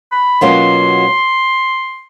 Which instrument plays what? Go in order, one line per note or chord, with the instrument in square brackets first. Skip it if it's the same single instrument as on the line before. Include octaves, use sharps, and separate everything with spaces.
[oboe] B5
[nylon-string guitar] B2 F#3 A#3 C#4 F4 [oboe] C6